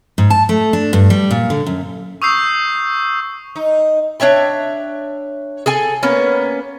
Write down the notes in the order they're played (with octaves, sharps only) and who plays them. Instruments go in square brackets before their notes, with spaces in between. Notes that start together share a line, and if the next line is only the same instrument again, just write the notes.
[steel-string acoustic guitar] G#2
A5
A3
D4
G2
G3
A#2
D3
F#2
[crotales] C#6 D#6 E6 G6 C7
[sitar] D#4
[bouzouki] D4 C#5 E5 G5
G#4 A4 G#5
A#3 B3 C#4